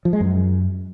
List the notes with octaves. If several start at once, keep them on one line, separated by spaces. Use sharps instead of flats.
F3
G#3
F#2